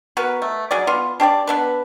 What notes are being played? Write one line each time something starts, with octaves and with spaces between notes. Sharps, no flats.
B3 F#4 A#4 B4
A3
F#3 G#4 D5
B3 F4
D4 G4 C#5 D5
B3 D4 B4